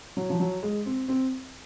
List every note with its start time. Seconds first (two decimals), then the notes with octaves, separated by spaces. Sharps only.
0.17 F#3
0.30 F3
0.40 F#3
0.63 G#3
0.86 C4
1.08 C4